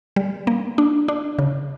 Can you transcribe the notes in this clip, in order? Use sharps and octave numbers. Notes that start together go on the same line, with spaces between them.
G3
A#3
D4
D4
C#3